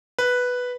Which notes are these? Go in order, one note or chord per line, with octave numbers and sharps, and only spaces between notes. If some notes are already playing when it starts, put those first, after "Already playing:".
B4